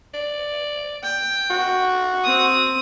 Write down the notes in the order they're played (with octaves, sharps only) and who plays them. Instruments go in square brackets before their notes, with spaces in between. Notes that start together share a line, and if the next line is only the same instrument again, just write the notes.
[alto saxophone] D5
[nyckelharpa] G5
[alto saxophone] F#4
[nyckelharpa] C4 D#6